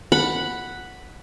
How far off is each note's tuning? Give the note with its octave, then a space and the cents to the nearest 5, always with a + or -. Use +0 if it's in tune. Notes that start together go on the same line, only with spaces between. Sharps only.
F#5 +0 B5 +0